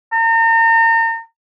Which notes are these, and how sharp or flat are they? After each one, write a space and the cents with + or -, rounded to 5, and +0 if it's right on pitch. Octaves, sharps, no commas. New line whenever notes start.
A#5 -40